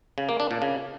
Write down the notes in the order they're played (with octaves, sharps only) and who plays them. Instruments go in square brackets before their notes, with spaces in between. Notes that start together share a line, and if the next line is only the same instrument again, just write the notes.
[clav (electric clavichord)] C#3
A#3
D4
A#2
C#3